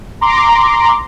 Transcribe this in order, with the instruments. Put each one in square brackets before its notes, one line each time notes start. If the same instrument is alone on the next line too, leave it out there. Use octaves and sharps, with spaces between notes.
[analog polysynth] A#5 C6 D6